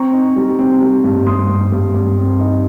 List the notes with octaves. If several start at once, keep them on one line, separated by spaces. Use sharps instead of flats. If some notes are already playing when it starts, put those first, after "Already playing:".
Already playing: C4 A#5 C#6
D#4
G3
C4
G3
G2
G2 C6 D#6
G2
G2
G2
C4
D#4